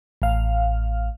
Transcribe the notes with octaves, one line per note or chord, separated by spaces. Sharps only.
A1 F5